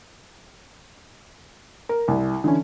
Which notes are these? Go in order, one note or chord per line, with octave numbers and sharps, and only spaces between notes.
A#4
C2
D3 E3 C#4